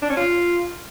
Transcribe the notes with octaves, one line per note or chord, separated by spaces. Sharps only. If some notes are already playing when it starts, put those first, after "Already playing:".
D4
C#4
F4